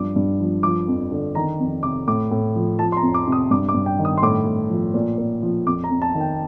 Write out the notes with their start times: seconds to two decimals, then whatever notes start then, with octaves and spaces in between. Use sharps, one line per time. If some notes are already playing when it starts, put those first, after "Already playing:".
Already playing: G2 F3 D6
0.16 G2
0.40 F3
0.63 F3 D6
0.88 F2
1.12 D3
1.35 D#3 A#5
1.59 F2
1.83 C3 D6
2.07 A2 D6
2.31 A2
2.56 F3
2.79 F3 A5
2.92 C6
2.97 A#5
3.02 F2
3.14 D6
3.28 C3 D#6
3.51 G2 D6
3.69 D6
3.74 G2
3.86 G5
3.99 D#3
4.05 D#6
4.17 C6
4.22 A2 D6
4.46 A2
4.70 F3
4.94 A#2
5.18 A#2
5.43 F3
5.66 F2 D6
5.84 A#5
5.91 F2
6.02 A5
6.15 D#3
6.21 G5